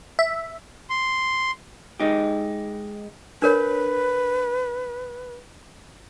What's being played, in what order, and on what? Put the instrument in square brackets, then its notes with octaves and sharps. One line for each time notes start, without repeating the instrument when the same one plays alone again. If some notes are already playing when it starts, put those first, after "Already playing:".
[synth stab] E5
[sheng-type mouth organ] C6
[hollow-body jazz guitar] G#3 D#4 G4
[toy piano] D4 A#4 C#5 [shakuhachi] B4